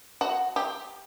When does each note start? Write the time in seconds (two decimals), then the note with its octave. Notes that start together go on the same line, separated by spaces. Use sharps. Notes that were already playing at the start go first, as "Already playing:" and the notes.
0.21 F#4
0.56 G4